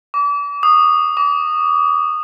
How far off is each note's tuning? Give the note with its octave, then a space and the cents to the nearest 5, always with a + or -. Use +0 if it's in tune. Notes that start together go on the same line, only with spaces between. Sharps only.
D6 -35
D#6 -20
D6 -35